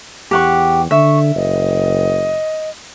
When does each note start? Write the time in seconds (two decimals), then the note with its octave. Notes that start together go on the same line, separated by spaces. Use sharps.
0.31 E2 G4 F#5 C#6
0.91 D3 E5 C#6
1.36 F#1 D#5